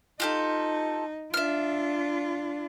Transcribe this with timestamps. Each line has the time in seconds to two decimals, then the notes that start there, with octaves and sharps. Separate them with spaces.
0.20 D#4 F4 G4 A4
1.34 D4 F4 E5 F6